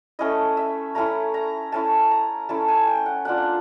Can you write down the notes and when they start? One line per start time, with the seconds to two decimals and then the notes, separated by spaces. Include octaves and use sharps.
0.19 A3 C#4 E4 D#5
0.57 E5
0.95 A3 C#4 E4 A#5
1.34 A#5
1.72 A3 C#4 E4 A5
2.11 A#5
2.49 A3 C#4 E4 A5
2.68 G#5
2.87 G5
3.06 F#5
3.25 A#3 D4 F4 F#5